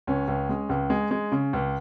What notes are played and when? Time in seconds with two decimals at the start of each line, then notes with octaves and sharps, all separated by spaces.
0.07 C#2 C#4
0.28 C#2
0.49 G#3
0.69 C#2
0.90 G#3
1.11 G#3
1.32 C#3
1.53 C#2